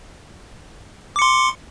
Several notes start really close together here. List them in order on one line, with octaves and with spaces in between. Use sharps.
D6 C#7 C6